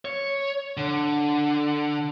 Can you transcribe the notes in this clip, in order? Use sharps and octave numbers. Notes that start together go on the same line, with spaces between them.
C#5
D3